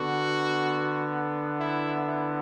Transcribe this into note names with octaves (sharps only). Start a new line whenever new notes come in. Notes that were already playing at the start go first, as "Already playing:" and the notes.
Already playing: D3 B3 F#4
E4
E4